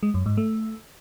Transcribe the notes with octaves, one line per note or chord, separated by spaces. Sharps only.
G#3
F#2
G#2
A3